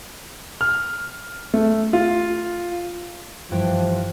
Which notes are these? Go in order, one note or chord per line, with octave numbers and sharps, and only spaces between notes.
F6
A3
F4
G2 E3 F3 G5